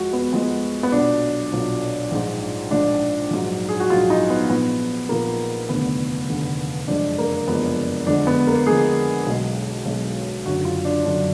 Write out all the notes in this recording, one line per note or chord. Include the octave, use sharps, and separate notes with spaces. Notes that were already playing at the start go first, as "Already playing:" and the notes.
Already playing: F2 F3 G#3 F#4
B3
F2 F3 G#3 B3
B3
B1 A#2 F#3 D4
B1 A#2 F#3
A#1 G#2 F3 G#3
A#1 G#2 F3 G#3 D4
A#1 G#2 F#3
G#4
F#4
A#1 G#2 F#3 F4
D#4
B3
A#1 A#2 F3 B3
A#1 A#2 F3 A#3
F1 D#2 D3 B3
F1 D#2 D3
F#1 F2 F3 G#3 D4
A#3
F#1 F2 F3 G#3 B3
F2 D3 G#3 D4
B3
A#3
F2 D3 G#3 G#4
B1 B2 G#3
B1 B2 G#3
F#1 F#2 D3 F#3 F#4
F4
D4
F#1 F#2 D3 F#3 D4